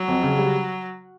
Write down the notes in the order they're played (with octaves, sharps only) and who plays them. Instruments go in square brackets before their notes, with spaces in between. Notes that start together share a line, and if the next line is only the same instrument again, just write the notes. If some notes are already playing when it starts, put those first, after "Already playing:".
Already playing: [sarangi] F#3
[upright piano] F2
C#3
G3